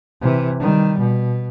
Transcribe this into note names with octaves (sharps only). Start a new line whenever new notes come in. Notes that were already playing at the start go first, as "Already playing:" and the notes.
C3 E3
D#3 G3
B2